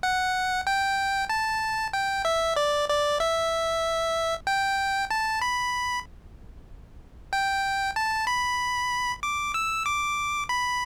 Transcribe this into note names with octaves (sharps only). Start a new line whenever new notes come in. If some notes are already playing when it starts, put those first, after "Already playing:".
F#5
G5
A5
G5
E5
D5
D5
E5
G5
A5
B5
G5
A5
B5
D6
E6
D6
B5